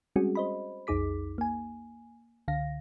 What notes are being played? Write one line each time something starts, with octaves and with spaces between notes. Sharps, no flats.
G3 G#3 C4 C#4 F#4 G#4
C5 D#5 B5
B1 F2 D#4 G#4 D6 B6
A#3 G#5
C#2 D3 F5 A#6